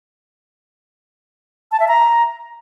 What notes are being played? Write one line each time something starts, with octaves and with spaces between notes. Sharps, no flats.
A5
E5
A#5